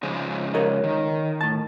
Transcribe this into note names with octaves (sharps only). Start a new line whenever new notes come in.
C#3 F3 G#3
A#4 C#5 D#5
D#3
A2 A5